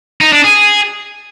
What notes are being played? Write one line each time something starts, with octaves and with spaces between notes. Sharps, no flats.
D#4
D4
G#4